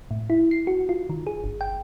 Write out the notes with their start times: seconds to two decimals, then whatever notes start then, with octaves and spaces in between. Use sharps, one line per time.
0.11 A2
0.30 E4
0.51 C7
0.67 F#4
0.89 F4
1.10 D#3
1.27 G#4
1.44 G1
1.61 G5